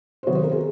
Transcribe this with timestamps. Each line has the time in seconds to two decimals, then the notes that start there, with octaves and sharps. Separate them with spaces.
0.23 C5
0.27 C3 D#3 F#3 B3 C#5
0.35 C5
0.43 A#4
0.51 G#4